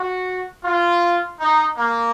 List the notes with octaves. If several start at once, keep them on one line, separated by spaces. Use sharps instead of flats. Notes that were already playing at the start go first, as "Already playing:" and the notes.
Already playing: F#4
F4
D#4
A#3